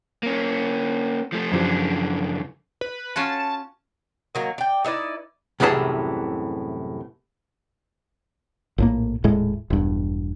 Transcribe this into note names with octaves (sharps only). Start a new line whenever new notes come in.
A#3 C#4
F3 A3
F#2 C#3 E3 F3 D4 G4
B4
C#4 F4 F#4 A5
D#3 F#3 A#3
D5 G5
D#4 E4 B4 D5
C2 F#2 A2 E3 G#4 A5
A#1 A2 A#3
D#1 A2 G#3
E1 G2